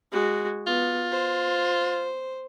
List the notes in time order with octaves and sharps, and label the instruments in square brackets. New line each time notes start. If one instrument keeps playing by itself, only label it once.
[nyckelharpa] G#3 F#4
[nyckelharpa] B3 [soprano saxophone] F4
[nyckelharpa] C5